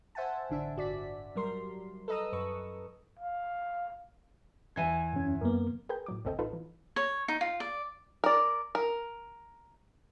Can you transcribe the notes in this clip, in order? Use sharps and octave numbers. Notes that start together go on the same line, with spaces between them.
C5 E5 F#5 G#5 A5
A1 D3 D4 E5
G1 F#4 D5 B6
F#3 G3 A#4 C6
A4 B4 D#5 A#5 D#6 E6
F#2 B4 C#6
F5
E2 E3 G#5 G#6
F#2 C#4
F#2 A#3 B3 A#4
G#4 A#4 B4 G5 G6
A2 F#3 D6
G#1 D2 C4 A4 D#5 G5
A1 D#4 F4 A4 B4
E3
C#5
D#4
F4
D5
A#4 D5
A#4